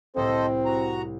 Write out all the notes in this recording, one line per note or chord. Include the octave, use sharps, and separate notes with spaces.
C2 A2 C3 C4 A4 C5 D#5
F#4 A#5